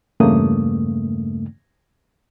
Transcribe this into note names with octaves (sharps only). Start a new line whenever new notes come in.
E2 G2 C#3 A3 A#3 D#6